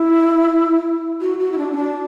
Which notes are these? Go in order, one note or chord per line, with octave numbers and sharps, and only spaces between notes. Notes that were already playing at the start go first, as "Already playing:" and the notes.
Already playing: E4
F#4
F#4
E4
D4
C#4
D4